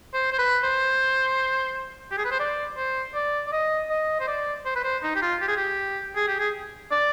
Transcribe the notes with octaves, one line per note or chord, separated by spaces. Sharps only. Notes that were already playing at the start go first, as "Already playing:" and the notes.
C5
C5
B4
C5
G4
G#4
B4
C5
D5
C5
D5
D5
D#5
D#5
C5
D5
C5
B4
C5
D#4
G4
F4
G4
G#4
G4
G#4
G4
G#4
D5